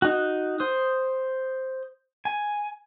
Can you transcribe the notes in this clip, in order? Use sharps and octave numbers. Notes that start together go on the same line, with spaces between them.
D#4 F#4
C5 D#6
G#5